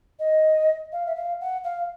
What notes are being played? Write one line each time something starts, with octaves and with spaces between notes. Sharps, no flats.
D#5
F5
E5
F5
F#5
F5